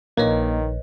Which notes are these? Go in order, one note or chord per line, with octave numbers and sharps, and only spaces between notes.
A#1 D#3 A#3 B4 C#5 D#5